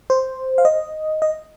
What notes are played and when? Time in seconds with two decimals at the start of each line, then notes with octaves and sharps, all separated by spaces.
0.10 C5
0.58 F5
0.65 D#5
1.22 D#5